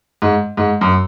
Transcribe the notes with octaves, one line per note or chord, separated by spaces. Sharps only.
G#2
G#2
F#2